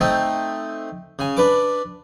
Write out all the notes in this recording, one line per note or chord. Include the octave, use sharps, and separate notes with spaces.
A3 C4 D#4 G5
C#3 G#5
D4 B4 D6